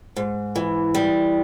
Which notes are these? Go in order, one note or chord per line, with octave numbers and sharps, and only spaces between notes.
G#2
E3
G3